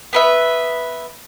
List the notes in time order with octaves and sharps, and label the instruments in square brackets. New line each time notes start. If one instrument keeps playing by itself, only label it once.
[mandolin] B3 B4 E5